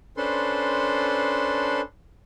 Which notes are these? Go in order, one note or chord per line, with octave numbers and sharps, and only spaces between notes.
C#4 D4 A4 B4 C5 C6